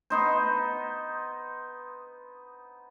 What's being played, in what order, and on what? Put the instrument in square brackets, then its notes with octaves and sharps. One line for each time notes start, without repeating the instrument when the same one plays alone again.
[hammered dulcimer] B3 D#4 C5